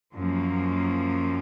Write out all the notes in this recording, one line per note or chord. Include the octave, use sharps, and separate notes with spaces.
F#2 F3 A#3